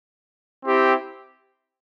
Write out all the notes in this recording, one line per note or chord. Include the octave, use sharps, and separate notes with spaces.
C4 E4 G4